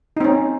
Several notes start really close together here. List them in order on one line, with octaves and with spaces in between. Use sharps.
D#4 C4 C#4